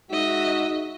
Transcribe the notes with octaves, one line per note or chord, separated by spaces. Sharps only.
G#3 D#4 F#4 D#5 E5